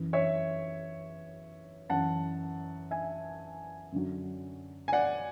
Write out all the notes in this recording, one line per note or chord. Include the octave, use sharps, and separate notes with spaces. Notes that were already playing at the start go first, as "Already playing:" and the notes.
Already playing: F#2 E3
C#5 E5
F#2 E3 F#5 A5
E5 G#5
F#2 D3 F#3
G#5
D5 F#5